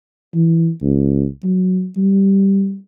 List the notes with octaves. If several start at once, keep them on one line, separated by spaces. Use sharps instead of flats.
E3
C#2
F#3
G3